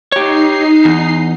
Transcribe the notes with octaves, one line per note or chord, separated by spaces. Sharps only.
D#4 G4 C#5 C7
E2